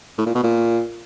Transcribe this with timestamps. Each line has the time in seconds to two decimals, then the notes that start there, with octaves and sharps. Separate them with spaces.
0.18 A2
0.26 A#2
0.35 B2
0.44 A#2